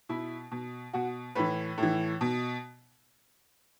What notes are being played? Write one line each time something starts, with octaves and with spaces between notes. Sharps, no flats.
B2 E4
B2
B2 F#4
A2 E3 B4
A2 E3
B2